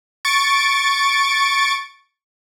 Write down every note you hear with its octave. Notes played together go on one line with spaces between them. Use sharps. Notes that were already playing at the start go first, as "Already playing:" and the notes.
C#6 A6 D7